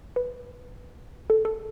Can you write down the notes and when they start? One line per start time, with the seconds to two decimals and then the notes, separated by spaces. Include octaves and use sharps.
0.16 B4
1.30 A4
1.45 A4